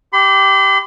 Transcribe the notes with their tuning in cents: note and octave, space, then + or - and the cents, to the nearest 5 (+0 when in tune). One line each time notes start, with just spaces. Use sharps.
G4 -10 C6 -45